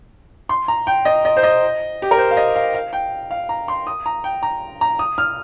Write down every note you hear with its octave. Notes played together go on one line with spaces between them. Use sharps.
C6
A#5
G5
D#5
D#5
C5
D#5
G4
A#4
C5
F5
D#5
F5
F5
G5
F5
A#5
C6
D#6
A#5
G5
A#5
A#5
D#6
F6